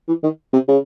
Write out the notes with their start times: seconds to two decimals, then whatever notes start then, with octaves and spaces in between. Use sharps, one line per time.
0.08 E3
0.23 D#3
0.53 C3
0.68 C#3